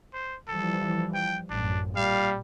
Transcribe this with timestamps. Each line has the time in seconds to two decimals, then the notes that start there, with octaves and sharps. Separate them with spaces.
0.13 C5
0.48 E3 F3 G3 A4
1.14 G5
1.50 A1 F#2 D4
1.96 A#2 G3 F5